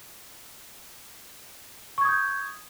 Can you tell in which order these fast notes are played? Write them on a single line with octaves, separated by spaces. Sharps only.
C#6 G#6 D#6 G6